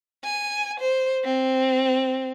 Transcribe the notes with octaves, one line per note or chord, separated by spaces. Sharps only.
G#5
C5
C4